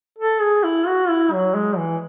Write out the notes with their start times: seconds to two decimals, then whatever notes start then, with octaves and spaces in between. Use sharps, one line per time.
0.19 A4
0.41 G#4
0.64 E4
0.87 F#4
1.10 E4
1.32 F#3
1.55 G#3
1.78 E3